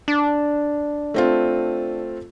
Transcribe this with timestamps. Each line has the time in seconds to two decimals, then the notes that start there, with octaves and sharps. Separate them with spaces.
0.08 D4
1.14 A3 C4 F4